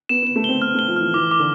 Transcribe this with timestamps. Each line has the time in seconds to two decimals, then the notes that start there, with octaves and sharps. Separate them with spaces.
0.09 B3 E7
0.23 B3 E7
0.36 A3
0.44 C4 G7
0.62 B3 F6
0.75 A3 G7
0.88 F3
0.96 E3 F6
1.14 E3 D6
1.31 D6
1.40 D3